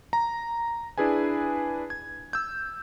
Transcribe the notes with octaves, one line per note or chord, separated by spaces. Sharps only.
A#5
D4 E4 G#4 B4 G#5
G#6
E6 G6